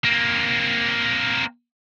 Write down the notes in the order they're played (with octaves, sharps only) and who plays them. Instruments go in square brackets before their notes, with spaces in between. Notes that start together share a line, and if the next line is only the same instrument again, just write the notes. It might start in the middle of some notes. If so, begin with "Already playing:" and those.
[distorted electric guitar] A#3 C4